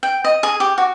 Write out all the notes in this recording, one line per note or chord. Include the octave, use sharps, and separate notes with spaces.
G5
D#5
G#4
G4
F#4